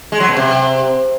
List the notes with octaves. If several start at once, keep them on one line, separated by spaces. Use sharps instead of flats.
G#3
F#3
B2
C3